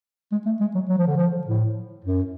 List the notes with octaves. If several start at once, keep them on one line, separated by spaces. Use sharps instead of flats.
G#3
A3
G#3
F#3
F#3
F3
D3
F3
A2
F#2